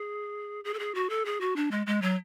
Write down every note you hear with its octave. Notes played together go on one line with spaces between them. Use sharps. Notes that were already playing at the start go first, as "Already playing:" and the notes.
Already playing: G#4
G#4
A4
G#4
F#4
A4
G#4
F#4
D4
G#3
G#3
F#3